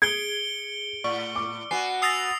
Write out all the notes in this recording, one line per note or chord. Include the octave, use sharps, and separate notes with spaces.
G#4 G#6 C#7 D7 G7
A2 D5 C#6
D6
B3 F#4 G#5 C7
D#6 E6 A6 A#6 C7 F7